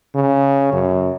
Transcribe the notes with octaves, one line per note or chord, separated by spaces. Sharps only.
C#3
F#2